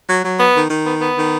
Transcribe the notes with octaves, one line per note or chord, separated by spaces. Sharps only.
F#3
F#3
B3
D#3
D#3
B3
B3
D#3